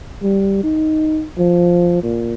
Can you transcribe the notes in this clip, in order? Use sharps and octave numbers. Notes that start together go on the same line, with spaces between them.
G3
D#4
F3
A#2